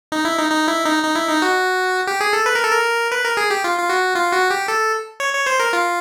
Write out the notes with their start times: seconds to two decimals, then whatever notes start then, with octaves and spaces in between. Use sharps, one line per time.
0.12 D#4
0.25 E4
0.38 D#4
0.51 D#4
0.68 E4
0.85 D#4
1.03 D#4
1.15 E4
1.29 D#4
1.42 F#4
2.07 G4
2.21 G#4
2.33 A4
2.46 B4
2.55 A#4
2.63 A4
2.72 A#4
3.12 B4
3.24 A#4
3.37 G#4
3.51 G4
3.64 F4
3.79 F4
3.89 F#4
4.16 F4
4.33 F#4
4.50 G4
4.68 A4
5.20 C#5
5.33 C#5
5.46 C5
5.60 A#4
5.73 F4